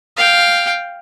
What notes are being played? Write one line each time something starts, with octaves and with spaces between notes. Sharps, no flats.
F5 G5